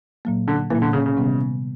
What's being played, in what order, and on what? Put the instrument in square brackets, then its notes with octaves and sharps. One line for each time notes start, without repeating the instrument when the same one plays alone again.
[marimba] A#2 F#3 A#3
[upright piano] D3
[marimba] A#2 F#3 A#3 [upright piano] E3
[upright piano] D3
C#3
C#3
[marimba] C3 D#3 G3 B3